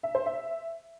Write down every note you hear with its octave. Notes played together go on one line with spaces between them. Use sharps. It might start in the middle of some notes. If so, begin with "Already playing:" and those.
E5
C5
E5